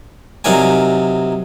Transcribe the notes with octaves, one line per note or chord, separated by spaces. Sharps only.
C3 F#3 D#4 A#4 D5 G#5